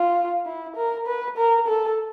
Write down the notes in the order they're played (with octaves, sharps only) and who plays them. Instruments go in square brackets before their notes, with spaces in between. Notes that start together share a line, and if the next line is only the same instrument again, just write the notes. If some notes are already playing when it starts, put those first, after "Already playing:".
Already playing: [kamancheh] F4
E4
A#4
B4
A#4
A4